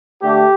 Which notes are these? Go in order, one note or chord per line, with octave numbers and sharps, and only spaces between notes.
D3 A3 G4